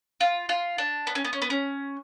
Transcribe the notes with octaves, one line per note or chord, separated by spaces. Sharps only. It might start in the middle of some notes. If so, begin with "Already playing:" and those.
F4
F4
D4
B3
C#4
B3
C#4
B3
C#4